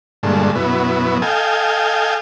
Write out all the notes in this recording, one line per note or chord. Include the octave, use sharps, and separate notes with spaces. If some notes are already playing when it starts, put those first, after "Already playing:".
G2 A#2 D3 G#3 A3
F#2 B2 B3 E4
A4 D#5 F5 G5 G#5